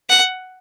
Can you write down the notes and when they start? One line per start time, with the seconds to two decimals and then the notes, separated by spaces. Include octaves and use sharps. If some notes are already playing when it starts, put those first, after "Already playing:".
0.09 F#5